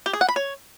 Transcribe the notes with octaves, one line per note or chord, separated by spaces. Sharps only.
G4
G#4
F#5
B5
C#5